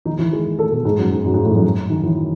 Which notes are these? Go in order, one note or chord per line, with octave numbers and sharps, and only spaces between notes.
D#3 D#4
E3 E4
G#3 G#4
A3 A4
B2 B3
G#2 G#3
F#2 F#3
G#2 G#3
F#2 F#3
G#2 G#3
A2 A3
F#2 F#3
D#3
E3